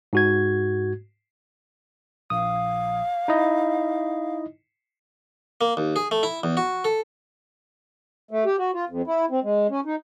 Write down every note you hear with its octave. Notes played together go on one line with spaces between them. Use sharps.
G#2 F#4 G#6
A#1 F5 D#6
D#4 E4 D#5
A#3
D#2
G#4
A3
E4
E2
F#4
A4
A3
G4
F#4
F4
F2
E4
C4
G#3
C#4
D#4